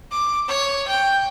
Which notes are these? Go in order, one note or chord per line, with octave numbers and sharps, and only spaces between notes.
D6
C#5
G5